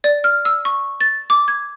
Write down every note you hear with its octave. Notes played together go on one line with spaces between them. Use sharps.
D5
F6
E6
C#6
A6
D6
G#6